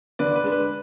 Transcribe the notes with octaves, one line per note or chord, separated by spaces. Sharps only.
D3 B4 D5
B4
G#3 D4
B4